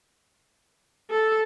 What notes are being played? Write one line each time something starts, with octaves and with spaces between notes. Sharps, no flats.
A4